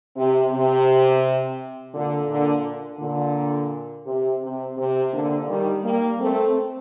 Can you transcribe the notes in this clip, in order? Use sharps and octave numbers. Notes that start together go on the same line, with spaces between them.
C3
C3
A#2 D3
A#2 D3
A#2 D3
C3
C3
C3
A#2 D3
D#3 G3
G3 A#3
A3 C4